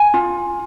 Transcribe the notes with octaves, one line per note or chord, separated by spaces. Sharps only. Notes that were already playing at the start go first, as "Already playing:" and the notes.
Already playing: G#5
F4